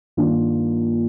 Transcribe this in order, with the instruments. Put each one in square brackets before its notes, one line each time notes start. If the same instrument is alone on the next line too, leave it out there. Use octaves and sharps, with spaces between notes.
[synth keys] G2 D#3 A#3 D4 F4